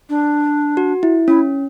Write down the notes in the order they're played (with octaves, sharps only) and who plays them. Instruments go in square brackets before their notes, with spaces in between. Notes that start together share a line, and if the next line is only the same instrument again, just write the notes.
[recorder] D4
[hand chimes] F#4
E4
[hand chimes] C#4 [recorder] E4